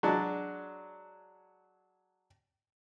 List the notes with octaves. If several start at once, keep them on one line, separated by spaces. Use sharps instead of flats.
F#3 G#3 D4